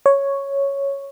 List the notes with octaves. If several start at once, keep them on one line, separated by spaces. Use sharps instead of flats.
C#5